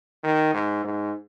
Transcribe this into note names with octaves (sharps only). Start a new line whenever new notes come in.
D#3
G#2
G#2